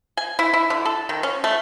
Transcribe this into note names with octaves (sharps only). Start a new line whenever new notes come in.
G#5
E4
E4
D3
A4
D#3
C#4
A3